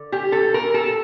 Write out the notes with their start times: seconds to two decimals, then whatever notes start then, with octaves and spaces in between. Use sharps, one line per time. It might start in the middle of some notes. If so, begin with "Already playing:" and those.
Already playing: D3
0.12 G4
0.32 A4
0.54 A#4
0.74 A4